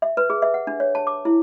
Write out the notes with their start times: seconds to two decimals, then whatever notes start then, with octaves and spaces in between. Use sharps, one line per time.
0.02 E5
0.17 B4
0.30 G#4
0.42 E5
0.54 F#5
0.67 D4
0.80 C#5
0.95 A5
1.07 D6
1.25 E4